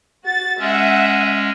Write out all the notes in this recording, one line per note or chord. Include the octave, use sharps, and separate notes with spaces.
F#4 A6
G#3 C#4 E5 F#5